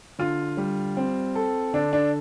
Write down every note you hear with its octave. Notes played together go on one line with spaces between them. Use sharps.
D3 F4
G3
C4
A4
D3 D4
D4